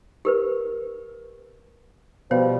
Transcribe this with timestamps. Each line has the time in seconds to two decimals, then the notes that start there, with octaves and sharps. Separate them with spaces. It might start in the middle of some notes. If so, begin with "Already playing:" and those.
0.25 G4 A#4 B4
2.31 B2 F3 G3 B3 B4 F5